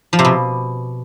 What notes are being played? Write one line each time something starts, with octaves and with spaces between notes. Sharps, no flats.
F3
C3
B2